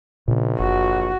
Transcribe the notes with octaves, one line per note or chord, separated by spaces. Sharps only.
A#1 A#2 C#3
F#1 F#4